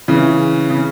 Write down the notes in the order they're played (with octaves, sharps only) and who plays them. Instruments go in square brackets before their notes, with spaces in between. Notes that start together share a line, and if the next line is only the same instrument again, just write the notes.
[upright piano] C#3 E3
C#3